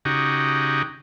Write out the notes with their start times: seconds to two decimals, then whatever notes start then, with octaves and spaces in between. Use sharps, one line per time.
0.05 C#3 D#4 F#4 G4